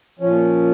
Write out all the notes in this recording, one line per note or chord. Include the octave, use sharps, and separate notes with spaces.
A#2 F3 C#4